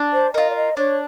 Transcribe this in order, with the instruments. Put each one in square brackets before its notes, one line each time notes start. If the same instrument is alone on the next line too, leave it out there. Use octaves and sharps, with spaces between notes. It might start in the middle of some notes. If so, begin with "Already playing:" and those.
Already playing: [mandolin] D4
[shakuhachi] C5
[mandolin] F4 A#4 [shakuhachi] D#5
[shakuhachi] D5
D#5
[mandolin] D4 [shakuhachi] C#5